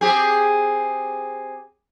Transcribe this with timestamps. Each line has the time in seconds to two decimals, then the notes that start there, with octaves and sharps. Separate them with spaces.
0.01 C4 G4 G#4